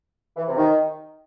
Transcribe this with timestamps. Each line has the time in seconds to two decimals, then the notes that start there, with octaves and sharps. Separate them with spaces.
0.37 E3
0.47 C3
0.57 D#3